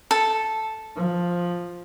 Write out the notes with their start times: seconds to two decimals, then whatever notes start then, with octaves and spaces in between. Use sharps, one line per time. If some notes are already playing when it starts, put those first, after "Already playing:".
0.11 A4
0.96 F3